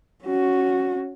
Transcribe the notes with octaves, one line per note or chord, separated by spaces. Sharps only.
C#4 F#4